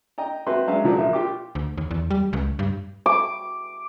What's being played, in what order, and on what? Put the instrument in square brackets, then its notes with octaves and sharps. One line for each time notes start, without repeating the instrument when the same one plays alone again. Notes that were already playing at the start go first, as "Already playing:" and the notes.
[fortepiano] D#5 G5 A#5
C4 F#4 B4 E5 C6
F#3 G#3 C#4 D4 E5 F5
C#2 F3 F#3 D4
A#1 E5
F4 G4 D6
[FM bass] D2
D#2
E2
G3
C#2
G2
[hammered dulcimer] D6